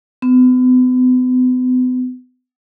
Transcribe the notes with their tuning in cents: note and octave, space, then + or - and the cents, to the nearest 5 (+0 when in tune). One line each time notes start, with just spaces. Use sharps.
B3 +40